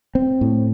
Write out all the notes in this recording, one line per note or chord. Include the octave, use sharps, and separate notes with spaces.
C4
A2